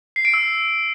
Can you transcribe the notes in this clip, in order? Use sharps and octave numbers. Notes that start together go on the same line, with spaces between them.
C7
D7
E6